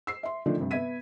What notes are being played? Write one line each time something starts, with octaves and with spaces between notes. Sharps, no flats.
E6 C7
E5 C6
D3 D#3 F3 A3 D4
G2 C3
B3 E5 G#6 B6 D#7